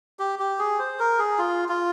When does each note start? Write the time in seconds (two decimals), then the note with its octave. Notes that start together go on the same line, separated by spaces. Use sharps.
0.19 G4
0.39 G4
0.59 G#4
0.79 C5
0.99 A#4
1.19 G#4
1.39 F4
1.69 F4